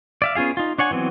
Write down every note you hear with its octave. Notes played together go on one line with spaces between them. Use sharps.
D5 E5 F5
B3 C#4 F4 G#4 F5
D#4 F4
D4 C#5 F#5 G#5
E3 F#3 B3 C4